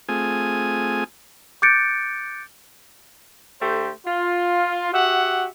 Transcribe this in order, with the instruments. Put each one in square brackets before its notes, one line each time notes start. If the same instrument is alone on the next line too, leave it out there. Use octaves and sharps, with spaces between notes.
[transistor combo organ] A3 C4 F4 G#4 G#5 D#6
[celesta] D6 F#6 G6 A6 C#7 D7
[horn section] D3 A3 G4 C5
F4
F#4 G4 E5 F#5